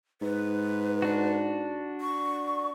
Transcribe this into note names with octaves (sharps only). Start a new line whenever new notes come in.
G#2 B4
D4 F#4
C#6